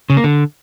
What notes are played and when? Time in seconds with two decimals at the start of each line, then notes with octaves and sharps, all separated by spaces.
0.10 C#3
0.17 A#3
0.24 D3